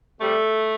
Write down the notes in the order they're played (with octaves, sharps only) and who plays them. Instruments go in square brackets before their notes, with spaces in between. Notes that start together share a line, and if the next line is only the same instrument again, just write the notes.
[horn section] C3 G3 A3